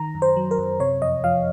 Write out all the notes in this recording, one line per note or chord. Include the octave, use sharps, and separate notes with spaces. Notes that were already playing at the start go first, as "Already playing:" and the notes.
Already playing: D#3 A#5
F#2
C5
F#3
A#4
F#2
C3 C#5
F2 D#5
F3 F5